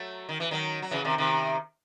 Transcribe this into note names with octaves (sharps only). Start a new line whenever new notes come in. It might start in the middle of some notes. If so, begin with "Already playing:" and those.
Already playing: F#3 A3
D#3
E3
D#3 F#3
F#3
C#3 E3
C3 D#3
C3 D#3